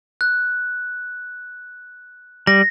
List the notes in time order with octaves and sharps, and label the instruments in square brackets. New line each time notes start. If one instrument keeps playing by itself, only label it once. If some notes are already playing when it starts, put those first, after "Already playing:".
[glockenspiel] F#6
[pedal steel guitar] G3 [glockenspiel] A#6